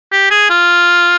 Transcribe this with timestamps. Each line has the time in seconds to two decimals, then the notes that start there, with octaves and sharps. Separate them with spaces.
0.12 G4
0.30 G#4
0.50 F4